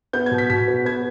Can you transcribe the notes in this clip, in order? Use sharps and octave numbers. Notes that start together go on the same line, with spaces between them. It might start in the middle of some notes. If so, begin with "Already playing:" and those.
B3 G6
G#6
B2
B6
B2 B6
B3
B3 G#6